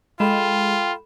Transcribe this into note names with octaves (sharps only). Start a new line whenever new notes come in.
G#3 F4 A4 G5 B5 E7